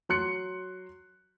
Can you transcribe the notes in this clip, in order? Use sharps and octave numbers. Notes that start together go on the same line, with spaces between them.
F#3 C6 F#6 C#7